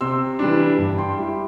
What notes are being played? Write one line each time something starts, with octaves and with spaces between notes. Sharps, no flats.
C3 C6 E6
E3 G3 D4
G2
G5 C6
G3 E4